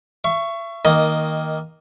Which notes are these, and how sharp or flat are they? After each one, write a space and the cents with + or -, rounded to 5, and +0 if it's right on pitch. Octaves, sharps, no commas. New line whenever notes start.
E5 +35 C#6 +0
D#3 +15 A#3 +0 D#5 +0